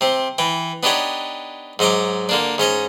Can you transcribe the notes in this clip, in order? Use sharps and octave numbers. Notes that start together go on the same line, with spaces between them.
C3 C4
E3 G5
B3 D4 D#4 G4 C#5 F#5
G#2 F#3 D#5 A#5 D6
D3 A#3 D4
G#2 C#4 D#5 A#5